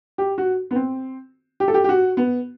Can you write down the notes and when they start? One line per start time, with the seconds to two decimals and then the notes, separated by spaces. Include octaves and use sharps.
0.18 G4
0.38 F#4
0.71 B3
0.75 C4
1.60 G4
1.68 A4
1.74 G4
1.84 G4
1.89 F#4
2.17 B3